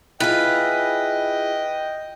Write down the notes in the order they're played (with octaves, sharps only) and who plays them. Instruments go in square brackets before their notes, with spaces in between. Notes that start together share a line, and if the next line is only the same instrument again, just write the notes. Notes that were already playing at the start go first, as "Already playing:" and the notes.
[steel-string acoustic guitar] E4 F4 G#4 [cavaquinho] B4 [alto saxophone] D#5 [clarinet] G5